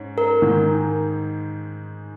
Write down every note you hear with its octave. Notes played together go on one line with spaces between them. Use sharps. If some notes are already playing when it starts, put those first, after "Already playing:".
Already playing: G#2 C#4
A#4
G#2 D#3 G#3